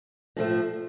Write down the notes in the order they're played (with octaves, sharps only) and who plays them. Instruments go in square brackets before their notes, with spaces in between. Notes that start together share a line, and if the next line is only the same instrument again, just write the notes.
[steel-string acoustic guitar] A2 F3 A3